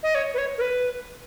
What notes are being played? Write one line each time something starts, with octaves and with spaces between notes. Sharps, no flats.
D#5
C#5
B4
C#5
A#4
B4